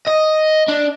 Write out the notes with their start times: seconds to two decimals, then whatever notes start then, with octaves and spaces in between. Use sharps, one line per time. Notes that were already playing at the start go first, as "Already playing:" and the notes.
0.08 D#5
0.69 D4